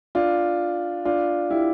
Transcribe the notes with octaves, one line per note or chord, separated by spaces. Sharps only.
D4 F4
D4 F4
E4 G4